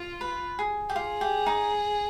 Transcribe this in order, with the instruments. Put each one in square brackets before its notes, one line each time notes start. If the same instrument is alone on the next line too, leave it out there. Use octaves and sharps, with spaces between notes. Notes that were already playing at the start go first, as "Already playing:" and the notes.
Already playing: [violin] F4
[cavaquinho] B4
G#4
G4
[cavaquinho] F4 [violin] G#4
[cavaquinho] G4
D#4